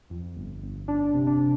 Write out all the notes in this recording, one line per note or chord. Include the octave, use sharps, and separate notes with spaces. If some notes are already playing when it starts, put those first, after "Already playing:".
F2
G1
G1
G1 D4
C3
D4